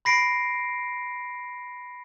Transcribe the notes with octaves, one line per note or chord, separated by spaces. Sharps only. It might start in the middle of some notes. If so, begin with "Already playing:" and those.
B5 A#6 C7 D7